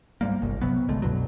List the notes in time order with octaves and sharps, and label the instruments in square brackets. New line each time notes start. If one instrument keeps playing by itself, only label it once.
[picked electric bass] G#2 G3 A#3
G1 C2
C3 F#3 B3
C2 D3 G#3 A3
F#2 B2 D3 F#3